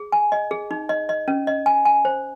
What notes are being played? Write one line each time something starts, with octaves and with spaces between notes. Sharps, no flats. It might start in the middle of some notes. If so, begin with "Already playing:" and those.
Already playing: G#4
G#5
D#5
G#4
D#4
D#5
D#5
C#4
D#5
G#5
G#5
C5